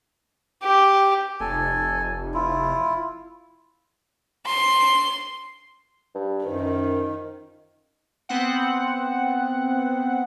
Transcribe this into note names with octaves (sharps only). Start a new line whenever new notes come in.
G4
F1 A4 G#5
E4 F4
C6
G2
F#2 D#3 F3
B3 C4 F#5